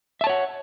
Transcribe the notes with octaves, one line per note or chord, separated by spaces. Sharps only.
C#5 E5 F#5 A5